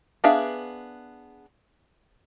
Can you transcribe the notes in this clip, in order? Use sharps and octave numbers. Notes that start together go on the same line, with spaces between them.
B3 D4 G#4 E5 F5